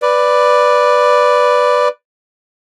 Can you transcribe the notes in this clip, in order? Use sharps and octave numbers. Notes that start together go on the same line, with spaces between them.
B4 D5